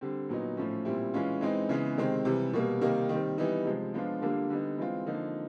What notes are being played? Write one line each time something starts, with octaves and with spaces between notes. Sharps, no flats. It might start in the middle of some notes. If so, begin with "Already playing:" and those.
D3 G3 C4
A#2 F#3 B3 D#4
A2 F3 A3 C#4
A#2 G3 C4 E4
E3 G#3 C#4 F4
E3 G#3 C4 D#4
C#3 E3 G#3 B3
C3 D#3 G#3 C4
C3 E3 G3
B2 G3 A#3
C3 D#3 G3 A#3 D#4
D#3 G3 C4
E3 G3 B3 D#4
C3 F3 G#3
F3 G#3 B3 D4 F4
D3 G3 A#3 D4 F4
D3 G3 B3 D#4
E3 G#3 C4 F4
D3 F3 A#3 D#4